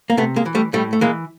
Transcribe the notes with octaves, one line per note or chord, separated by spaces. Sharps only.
A#3
C3 A3 B3
G#3 A#3
E3
G3 A3
A2 G3 A3
A3
E3 G#3 A#3